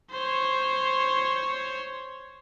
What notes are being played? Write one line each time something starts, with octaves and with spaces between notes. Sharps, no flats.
C5 C#5